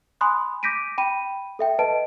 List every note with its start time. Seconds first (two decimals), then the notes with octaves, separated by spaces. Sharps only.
0.21 G#5 B5 C6 D#6 F#6
0.63 D6 G6 A#6 B6 D7 D#7
0.98 G5 B5 D#7
1.59 A4 E5 G5
1.79 B4 D#5 A5 D7